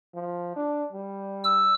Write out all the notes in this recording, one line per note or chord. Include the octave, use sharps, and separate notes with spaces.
F3
D4
G3
E6